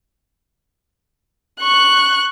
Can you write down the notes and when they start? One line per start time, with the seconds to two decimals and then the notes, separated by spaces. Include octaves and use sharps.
1.61 C#6 F#6